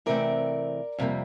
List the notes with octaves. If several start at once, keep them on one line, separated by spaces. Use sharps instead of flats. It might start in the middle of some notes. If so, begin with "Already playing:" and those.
C3 E3 A3 C4 A#4 D5
F2 C3 G3 A#3